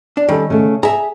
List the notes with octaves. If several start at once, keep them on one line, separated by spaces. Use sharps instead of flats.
D4
D#3 G3 C#4 A4
C#3 A3
G#4 E5 A#5